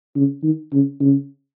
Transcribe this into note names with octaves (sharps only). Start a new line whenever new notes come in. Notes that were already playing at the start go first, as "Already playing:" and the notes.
C#3
D#3
C#3
C#3